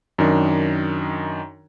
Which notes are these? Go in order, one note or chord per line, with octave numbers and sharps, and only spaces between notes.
F#2 D#3 D4